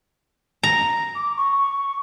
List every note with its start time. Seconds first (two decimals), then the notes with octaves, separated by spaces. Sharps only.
0.63 A#5
1.15 D6
1.36 C#6